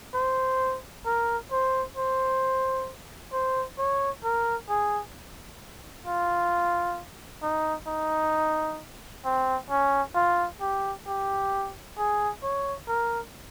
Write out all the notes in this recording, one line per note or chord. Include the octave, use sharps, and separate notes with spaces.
C5
A#4
C5
C5
C5
C#5
A#4
G#4
F4
D#4
D#4
C4
C#4
F4
G4
G4
G#4
C#5
A#4